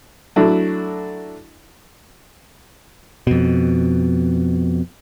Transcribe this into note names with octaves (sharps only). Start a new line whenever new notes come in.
F#3 A3 D4 E4 F#4
F2 B2